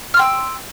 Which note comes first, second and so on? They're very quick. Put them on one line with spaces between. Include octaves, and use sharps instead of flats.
F6 C6 G5 E6